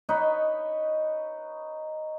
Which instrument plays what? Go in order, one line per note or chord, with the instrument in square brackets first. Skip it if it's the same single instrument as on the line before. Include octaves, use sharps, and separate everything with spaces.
[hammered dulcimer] D#4 B4 C#5 D#5